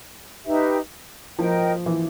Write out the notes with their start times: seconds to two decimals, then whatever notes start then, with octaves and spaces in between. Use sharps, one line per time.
0.45 D#4 G4 B4 E5
1.39 F3 A#4 D#5 G5
1.86 E3